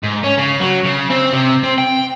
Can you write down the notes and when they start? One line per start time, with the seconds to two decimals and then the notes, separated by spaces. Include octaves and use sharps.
0.03 G#2
0.24 C#4
0.38 C#3
0.61 F#3
0.84 C#3
1.10 C4
1.33 C3
1.63 C4
1.78 G5